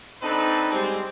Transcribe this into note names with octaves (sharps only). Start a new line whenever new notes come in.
C4 D4 D#4 A4 B4
G3 G#3 C4